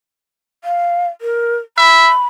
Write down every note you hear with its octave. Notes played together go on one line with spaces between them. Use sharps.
F5
A#4
E5 B5